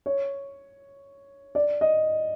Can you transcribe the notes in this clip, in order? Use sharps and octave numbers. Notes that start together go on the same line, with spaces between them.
C#5
D5
D#5